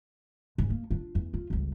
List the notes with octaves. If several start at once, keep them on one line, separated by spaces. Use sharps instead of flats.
G#2
A#3
D4 F4
E2
F4
G1 C#2